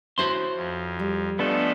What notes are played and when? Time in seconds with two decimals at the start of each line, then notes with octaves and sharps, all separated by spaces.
0.18 C#4 E4 F#4 C5 C6
0.55 F2
0.99 G3
1.39 F3 G#3 A3 B3 D4 A4